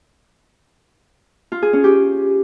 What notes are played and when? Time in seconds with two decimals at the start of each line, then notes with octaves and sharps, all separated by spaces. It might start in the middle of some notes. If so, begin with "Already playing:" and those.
1.52 F4
1.62 G#4
1.73 C#4
1.84 G4